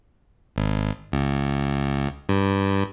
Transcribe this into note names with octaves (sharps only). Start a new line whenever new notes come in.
G#1
C#2
G2